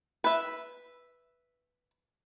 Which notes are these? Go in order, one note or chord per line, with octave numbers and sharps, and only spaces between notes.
B4 E5